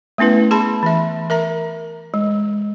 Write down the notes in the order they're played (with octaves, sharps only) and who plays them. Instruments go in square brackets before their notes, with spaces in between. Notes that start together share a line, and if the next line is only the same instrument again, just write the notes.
[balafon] A3 B3 C#4 E4 B4
G#4 A5 B5 C6
E3 E5
A#4 E5 A#5
G#3